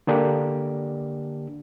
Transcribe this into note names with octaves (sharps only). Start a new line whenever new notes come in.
D3 A#3 D4 G4